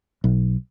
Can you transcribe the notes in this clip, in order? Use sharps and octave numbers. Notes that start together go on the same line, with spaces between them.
B1